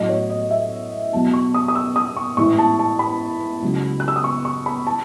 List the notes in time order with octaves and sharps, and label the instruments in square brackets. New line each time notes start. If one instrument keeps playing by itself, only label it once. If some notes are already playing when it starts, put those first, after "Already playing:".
Already playing: [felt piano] A1 A2 F#3 D#5
C#5
D#5
E5
E2 B2 F#3 A5
C#6
D#6
D#6
E6
D#6
C#6
A1 G#2 E3 C#6
A5
A5
B5
C#2 C#3 F#3
F#6
E6
D#6
C#6
C#6
B5
A5